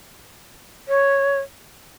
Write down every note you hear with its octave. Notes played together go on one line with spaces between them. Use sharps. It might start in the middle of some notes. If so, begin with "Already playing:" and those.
C#5